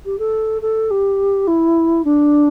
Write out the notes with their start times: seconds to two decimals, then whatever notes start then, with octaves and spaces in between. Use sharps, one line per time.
0.05 G4
0.19 A4
0.62 A4
0.91 G4
1.47 E4
2.05 D4